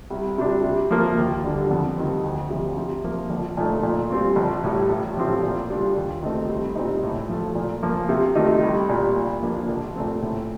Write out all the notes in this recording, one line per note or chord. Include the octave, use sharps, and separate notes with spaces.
C2
C3 G3 D4
C3
F3 A#3
D#2
D3 G3 D4
F2
D#3 G3 C4
D2
C3 F3
C3
F3 A#3
A#1
A#2 F3 A3 D#4
A#2
G3 C4 F4
A#1
A2 G3
A1
A2 F3 C4 G4
A#2
G3 D4 F4
D#2
D#3 A3 C4 D#4
C2
A#2 G3 C4 D#4
A2
F3 A3
A#2
F3 A#3
C3
D#3 A3 D#4 G4
C2
A#2 G3
A#2
F3 A#3 D4
A#1
A#2 A3 C4
A2